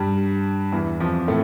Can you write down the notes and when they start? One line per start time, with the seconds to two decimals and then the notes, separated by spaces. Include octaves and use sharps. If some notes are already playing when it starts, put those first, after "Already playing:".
Already playing: G2 G3
0.72 E2 E3
1.00 F2 F3
1.28 A2 A3